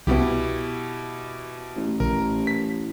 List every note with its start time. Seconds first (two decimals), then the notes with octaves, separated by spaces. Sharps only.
0.07 C2 B2 B3 E4 G4
1.77 A1
2.00 A#1 A#4
2.47 B6